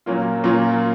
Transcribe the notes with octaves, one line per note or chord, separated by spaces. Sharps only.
A#2 F#3 A#3 C#4 F4
A#2 F#3 A#3 C#4 F4